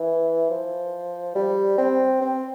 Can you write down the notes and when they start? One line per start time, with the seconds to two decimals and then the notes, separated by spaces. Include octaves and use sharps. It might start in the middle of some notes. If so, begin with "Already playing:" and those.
Already playing: E3
0.50 F3
1.35 G3
1.78 C4
2.21 C4